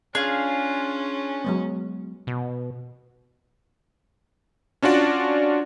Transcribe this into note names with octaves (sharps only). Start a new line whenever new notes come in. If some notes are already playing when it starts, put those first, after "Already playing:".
C#4 D4 F4 G#4 F5
F#3 G#3 B3
B2
C#4 D4 F4 F#4 D5